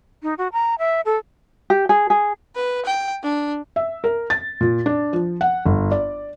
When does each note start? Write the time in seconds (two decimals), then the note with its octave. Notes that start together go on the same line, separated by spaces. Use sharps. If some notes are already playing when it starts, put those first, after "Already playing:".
0.23 D#4
0.38 F#4
0.53 A#5
0.79 E5
1.05 A4
1.70 G4
1.89 G#4
2.10 G#4
2.55 B4
2.86 G5
3.23 D4
3.76 E5
4.04 A#4
4.30 A6
4.61 A#2
4.86 D4
5.13 F3
5.41 F#5
5.65 G1
5.91 D5